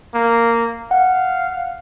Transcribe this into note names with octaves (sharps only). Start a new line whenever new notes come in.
A#3
F5 F#5